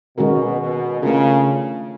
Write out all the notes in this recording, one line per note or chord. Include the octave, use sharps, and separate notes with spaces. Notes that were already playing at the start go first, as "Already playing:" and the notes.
B2 D#3 G#3 C#4 F#4 A#4
B2
C#3 A3 D4 F4 A#4